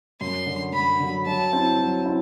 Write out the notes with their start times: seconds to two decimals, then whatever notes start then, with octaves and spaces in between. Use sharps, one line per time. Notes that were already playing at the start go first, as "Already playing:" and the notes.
0.21 F#2 C6
0.46 D3 F#3
0.73 F#2 B5
1.00 D3 F#3
1.26 F#3 A5
1.53 C4 E4
1.78 F#3
2.05 C4 E4